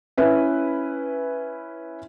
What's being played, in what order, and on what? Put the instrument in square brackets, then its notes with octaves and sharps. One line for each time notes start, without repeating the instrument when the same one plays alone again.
[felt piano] C#4 E4 B4 E5